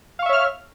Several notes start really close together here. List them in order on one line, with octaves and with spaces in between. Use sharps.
F5 C#6 E5 C#5 F6